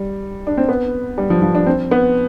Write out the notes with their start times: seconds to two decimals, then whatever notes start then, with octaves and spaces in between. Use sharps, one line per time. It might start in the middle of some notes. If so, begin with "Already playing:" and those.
Already playing: G3
0.47 D4
0.57 C4
0.69 B3
1.18 G3
1.30 F3
1.42 F3
1.55 D4
1.66 C4
1.91 B3